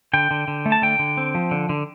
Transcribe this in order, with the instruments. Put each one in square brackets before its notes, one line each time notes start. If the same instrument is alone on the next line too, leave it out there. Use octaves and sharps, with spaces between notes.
[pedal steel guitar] D3 G5
D3
D3
A3
A5
D3 G5
D3
C4
F3
D3
D3